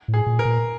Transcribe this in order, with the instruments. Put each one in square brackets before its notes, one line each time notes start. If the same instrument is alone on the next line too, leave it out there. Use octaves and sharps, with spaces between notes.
[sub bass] A2
[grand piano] G#4
[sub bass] A#2
[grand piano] A#4
[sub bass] A#2